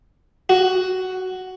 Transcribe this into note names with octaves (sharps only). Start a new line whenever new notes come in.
F#4